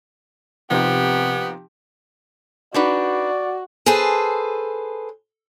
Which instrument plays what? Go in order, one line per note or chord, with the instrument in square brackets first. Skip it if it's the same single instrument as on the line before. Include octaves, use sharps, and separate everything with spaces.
[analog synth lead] C3 [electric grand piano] F3 C4 D#4 [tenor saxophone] B3 [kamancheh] G4
[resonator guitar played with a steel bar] D4 D#4 B4 [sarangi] F#4 [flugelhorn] D5
[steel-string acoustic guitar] G#4 A4 B4 C5